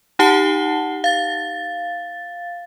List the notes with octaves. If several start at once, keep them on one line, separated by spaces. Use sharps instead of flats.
D#4 G4 F#5 A5 C7 G7
F5 A6